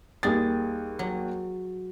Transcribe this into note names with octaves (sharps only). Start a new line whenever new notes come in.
D#2 G3 G#4 A6
F#3